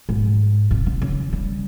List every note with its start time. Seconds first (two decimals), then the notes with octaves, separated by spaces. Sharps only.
0.09 G#2
0.71 C3
0.86 C#3
1.02 C#3
1.33 G3